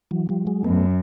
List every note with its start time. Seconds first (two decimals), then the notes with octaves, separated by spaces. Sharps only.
0.11 E3 F#3
0.29 F3 G3
0.47 F#3 G#3
0.64 F#2 A3 B3